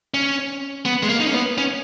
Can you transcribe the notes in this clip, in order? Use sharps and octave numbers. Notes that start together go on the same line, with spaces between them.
C#4
B3
G#3
A#3
D#4
C#4
B3
C#4